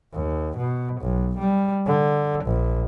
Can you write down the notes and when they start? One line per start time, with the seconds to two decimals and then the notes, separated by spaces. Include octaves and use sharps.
0.14 D#2
0.58 B2
1.01 B1
1.38 G3
1.87 D3
2.45 A#1